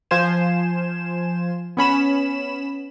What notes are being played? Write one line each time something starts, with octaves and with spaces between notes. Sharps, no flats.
F3 F4 C5 G#5 E7
B3 C#4 B5 E7